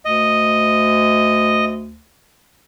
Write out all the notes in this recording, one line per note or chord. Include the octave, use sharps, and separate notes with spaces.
D2 D#5